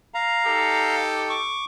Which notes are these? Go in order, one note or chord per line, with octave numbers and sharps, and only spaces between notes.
F5 A#5
D#4 G4 A4
C#6 D6